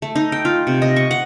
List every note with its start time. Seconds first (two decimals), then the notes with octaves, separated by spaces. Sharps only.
0.02 A3
0.15 D#4
0.32 G5
0.45 F4
0.67 C3
0.82 D#5
0.96 C#6
1.11 F#5